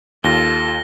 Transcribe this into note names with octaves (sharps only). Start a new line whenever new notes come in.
D#2 F4 A4 A#6 G7